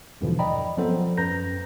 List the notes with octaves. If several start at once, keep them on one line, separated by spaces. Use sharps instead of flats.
E2 G2 B2 D3 E3 F3
D5 D#5 G5 A#5 B5
F3 F#3 B3 C4 A4 C5
F3
F#2 B4 A#5 G6 A#6